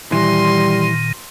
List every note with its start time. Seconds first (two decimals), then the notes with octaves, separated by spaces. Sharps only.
0.12 A#2 D#3 E3 G3 C6